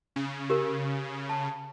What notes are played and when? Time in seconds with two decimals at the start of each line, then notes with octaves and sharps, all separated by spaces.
0.16 C#3
0.50 G4 A#4
1.29 A5